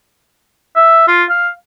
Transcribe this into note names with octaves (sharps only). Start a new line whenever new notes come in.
E5
F4
F5